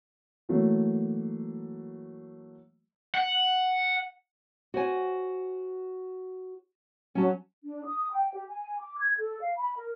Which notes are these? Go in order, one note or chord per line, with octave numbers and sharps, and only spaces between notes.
E3 F#3 A3 A#3
F#5
F#4 C5 G#5
F#3 C#4 A5
D4
D#6
G5
G4
G#5
D6
G#6
A4
F5
B5
A#4